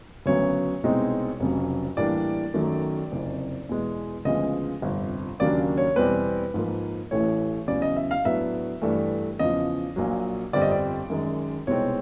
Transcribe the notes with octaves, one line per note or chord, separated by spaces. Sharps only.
D2 C#3 F#3 B3 C#5
C2 B2 G#3 C4 D#4
F1 F2 C#3 F#3
A2 E3 G3 A#3 D4 D5
F#2 D#3 F#3 A3
F#1 F2 C3
E2 B2 G#3
D2 C#3 F3 G#3 B3 D#5
G1 F2 C3
D#2 C#3 F#3 A#3 D4 D5
C#5
E2 B2 G3 C4 B4
G#2 F3 A#3
A1 A2 E3 A3 C#5
E2 C#3 F#3 D5
D#5
E5
F5
A2 F#3 B3 D4 E5
G2 E3 A3 D4
E2 C#3 F3 D#5
A#1 A#2 F#3
G1 F2 D3 G3 C4 D5
D#5
D5
F#2 D#3 G#3
C2 B2 G#3 C4 D#4 C#5